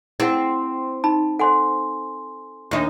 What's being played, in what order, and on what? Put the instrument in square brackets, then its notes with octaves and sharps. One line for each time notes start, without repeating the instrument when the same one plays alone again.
[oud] C4 [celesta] E4 [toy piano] G#4 F#5
[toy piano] D#4 B5 [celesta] A5
[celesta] A4 G#5 C6 [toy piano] C5 F#5
[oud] D#2 D#4 [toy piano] D4 E5 C#6